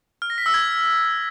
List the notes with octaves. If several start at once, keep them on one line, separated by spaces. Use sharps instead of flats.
F6
A#6
B6
E6
G#6